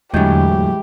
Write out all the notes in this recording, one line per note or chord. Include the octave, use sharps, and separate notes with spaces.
E2 A2 D3 E3 F#3 G#3 G4 G6